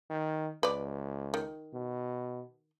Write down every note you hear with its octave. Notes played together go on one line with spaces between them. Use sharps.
D#3
C#2 B4 D5
D#3
B2